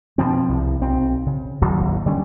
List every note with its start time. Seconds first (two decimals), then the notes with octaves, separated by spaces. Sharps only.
0.18 B2 D#3 F3 C4
0.49 C2
0.81 B1 C4
1.26 C#3
1.61 D1 G#1 D#2 F#3
2.06 D3 G3 A#3 C#4